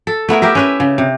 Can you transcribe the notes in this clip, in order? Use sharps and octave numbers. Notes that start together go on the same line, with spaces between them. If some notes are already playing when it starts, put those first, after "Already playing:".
A4
A3 B3 E4 A#4
G4 A#4 E5
C#4 B4 E5
C#3
C3